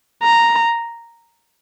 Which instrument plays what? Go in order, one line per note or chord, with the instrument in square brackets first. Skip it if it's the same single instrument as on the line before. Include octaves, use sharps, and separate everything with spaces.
[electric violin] A#5